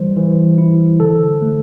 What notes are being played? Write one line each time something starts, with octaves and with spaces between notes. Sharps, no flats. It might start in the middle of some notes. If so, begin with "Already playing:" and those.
Already playing: E3 G3 C5
E3
E4
D3 A4
A3